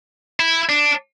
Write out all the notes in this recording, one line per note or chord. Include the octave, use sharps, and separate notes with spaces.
E4
D4